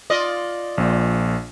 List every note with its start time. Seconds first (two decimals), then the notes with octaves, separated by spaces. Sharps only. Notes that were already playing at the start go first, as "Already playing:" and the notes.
0.10 F4 D5 D#5
0.78 A#1 A#2